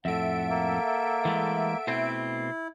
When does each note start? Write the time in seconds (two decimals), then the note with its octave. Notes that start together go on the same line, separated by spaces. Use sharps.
0.05 F2 A2 A4 E5 F#5 D7
0.49 A#3
1.25 E3 G#3 A3
1.87 B2 A3 C4 E4